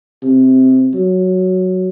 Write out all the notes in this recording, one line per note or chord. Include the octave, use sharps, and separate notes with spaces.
C3
F#3